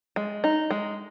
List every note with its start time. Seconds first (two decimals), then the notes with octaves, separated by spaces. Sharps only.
0.16 G#3
0.44 D#4
0.71 G#3